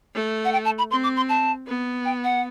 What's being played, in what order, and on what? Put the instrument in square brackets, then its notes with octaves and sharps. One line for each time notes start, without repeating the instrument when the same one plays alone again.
[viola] A3
[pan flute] F#5
G5
A5
B5
[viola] C4 [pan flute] C6
[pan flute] D6
C6
A5
[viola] B3
[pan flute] G5
F#5